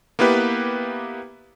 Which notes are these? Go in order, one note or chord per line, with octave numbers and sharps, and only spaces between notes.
A#3 B3 E4 G4 B4